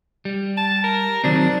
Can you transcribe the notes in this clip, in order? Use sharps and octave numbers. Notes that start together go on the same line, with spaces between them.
G3
A5
A#4
D#3 F#3 C4 D4